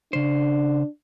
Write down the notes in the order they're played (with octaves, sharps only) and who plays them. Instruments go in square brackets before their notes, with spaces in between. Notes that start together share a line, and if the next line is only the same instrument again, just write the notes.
[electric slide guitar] C#3 C5 [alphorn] D4